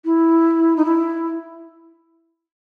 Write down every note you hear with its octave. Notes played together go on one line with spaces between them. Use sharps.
E4
D#4
E4